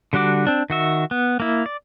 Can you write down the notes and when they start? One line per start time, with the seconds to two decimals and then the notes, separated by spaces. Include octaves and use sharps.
0.13 D3 G3 D4 F#4 D6
0.47 C4 D4
0.70 D#3 F#4 E5
1.11 B3
1.40 A#3 E4
1.66 D5